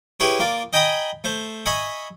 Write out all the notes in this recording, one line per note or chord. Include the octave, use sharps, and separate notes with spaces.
E4 G4 G#4 B4 C#5
A#3 F4 D5
D#5 G5 G#5 A#5 B5 D#6
A3 C5
D#5 E5 G#5 B5 C#6